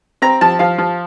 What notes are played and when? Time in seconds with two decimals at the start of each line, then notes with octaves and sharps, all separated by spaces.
0.22 C4 A#5
0.41 F3 A5
0.59 F3 F5
0.78 F3